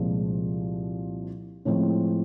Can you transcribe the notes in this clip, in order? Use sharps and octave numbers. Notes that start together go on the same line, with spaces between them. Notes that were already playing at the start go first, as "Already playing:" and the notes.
Already playing: C2 A#2 F3 G#3
A2 F3 G#3 C4